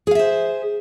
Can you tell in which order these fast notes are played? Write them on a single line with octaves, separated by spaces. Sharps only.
G#4 F5 E5 C5